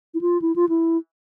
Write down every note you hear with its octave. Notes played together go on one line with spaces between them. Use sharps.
E4
F4
E4
F4
E4